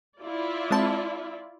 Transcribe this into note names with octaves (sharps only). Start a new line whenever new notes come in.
E4 F4 D5
G#3 C4 A5